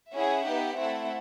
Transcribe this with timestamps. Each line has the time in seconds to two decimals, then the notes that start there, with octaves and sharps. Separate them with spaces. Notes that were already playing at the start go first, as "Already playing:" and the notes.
0.14 C#4 E4 G#4 E5 F#5
0.45 B3 D#4 G4
0.76 A3 C4 E4 A4 E5 F#5